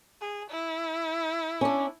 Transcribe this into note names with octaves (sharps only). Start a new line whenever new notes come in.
G#4
E4
C#4 D4